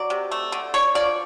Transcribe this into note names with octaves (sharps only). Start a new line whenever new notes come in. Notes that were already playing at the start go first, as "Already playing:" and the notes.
Already playing: F#3 D5
C3
A3
D3
D4 C#5
F3 D5